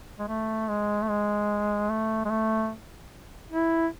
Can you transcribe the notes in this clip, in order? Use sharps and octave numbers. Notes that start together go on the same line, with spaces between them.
G#3
A3
G#3
A3
G#3
A3
G#3
A3
E4